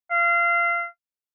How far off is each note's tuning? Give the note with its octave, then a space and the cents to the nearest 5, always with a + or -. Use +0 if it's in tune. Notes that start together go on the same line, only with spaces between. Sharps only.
F5 -25